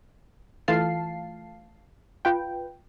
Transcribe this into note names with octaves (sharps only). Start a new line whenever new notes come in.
E3 A3 F4 F5 A5 C7
F4 B4 G5